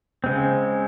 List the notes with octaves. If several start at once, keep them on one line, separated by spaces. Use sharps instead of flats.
C#3 G#3 C4